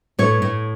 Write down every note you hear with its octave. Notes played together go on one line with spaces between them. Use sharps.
A2 C#5
A2